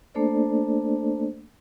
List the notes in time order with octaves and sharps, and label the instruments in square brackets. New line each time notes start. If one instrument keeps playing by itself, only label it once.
[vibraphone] A3 A#3 D4 A4 C5 D5